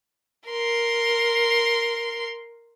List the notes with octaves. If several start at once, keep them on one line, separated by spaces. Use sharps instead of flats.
A#4 C6